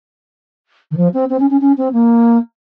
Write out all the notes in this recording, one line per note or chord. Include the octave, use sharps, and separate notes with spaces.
D#3
F3
C4
C4
C#4
C#4
C#4
C4
A#3